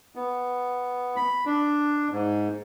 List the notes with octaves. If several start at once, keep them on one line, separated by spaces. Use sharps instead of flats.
B3
B5
D4
G#2